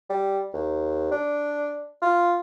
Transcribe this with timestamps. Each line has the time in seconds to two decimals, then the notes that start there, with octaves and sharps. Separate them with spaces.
0.10 G3
0.53 D#2
1.12 D4
2.02 F4